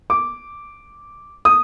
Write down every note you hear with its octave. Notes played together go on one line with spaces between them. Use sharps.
D6
D#6